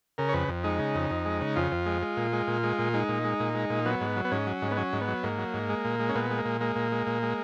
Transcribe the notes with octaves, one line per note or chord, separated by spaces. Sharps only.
C#3 A#4
C#5
F2 B4
F2
G#3 D#4
C#3
F2
F2
G#3
C#3
F2 F4
F2
G#3
G#3
A#2
G#3
A#2
G#3
A#2
G#3 D#4
A#2
G#3
A#2
G#3
A#2
F#3 B3
G#2
F#3
B3
G#2 C#4
F#3
G#2
B3
F#3 C#4
G#2
B3
F#3
G#2 A#3
F#3
G#2
G#3
A#2
G#3
C#4
A#2 B3
G#3
A#3
A#2
G#3 A#3
A#2
G#3
A#2
G#3